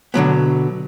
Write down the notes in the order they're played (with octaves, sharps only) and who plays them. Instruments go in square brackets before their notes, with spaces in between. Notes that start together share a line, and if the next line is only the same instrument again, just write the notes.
[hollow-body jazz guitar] B2 D3 F#3 B3